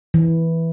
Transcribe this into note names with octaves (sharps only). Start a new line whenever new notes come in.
E3